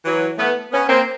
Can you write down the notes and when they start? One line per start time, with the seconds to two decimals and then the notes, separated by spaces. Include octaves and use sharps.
0.04 E3 F#3
0.38 A3 B3
0.72 B3 C#4
0.89 A#3 C4